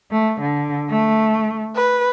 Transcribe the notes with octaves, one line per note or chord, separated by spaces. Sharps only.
A3
D3
A3
B4